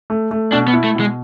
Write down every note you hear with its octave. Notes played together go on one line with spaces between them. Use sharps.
A3
A3
B2 D4
B3
E4
A3
B2 G#3